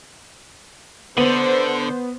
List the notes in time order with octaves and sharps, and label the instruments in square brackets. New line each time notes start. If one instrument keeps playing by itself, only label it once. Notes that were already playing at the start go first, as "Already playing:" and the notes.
[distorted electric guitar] D3 [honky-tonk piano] B3 D#7 [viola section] C5